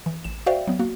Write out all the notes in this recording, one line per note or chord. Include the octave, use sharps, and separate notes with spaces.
E3
A1 E7
F#4 C5 D5 E5 F5 G5
F#3 B3
A#3 F#4